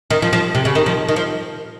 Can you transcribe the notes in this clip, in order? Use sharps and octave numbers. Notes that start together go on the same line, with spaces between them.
D#3
F3
F3
C3
C#3
D#3
F3
D#3
F3